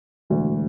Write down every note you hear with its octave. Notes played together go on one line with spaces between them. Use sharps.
E1 D2 D3